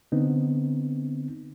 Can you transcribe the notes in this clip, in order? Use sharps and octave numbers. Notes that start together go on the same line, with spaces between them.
D3 B3 C4 D#4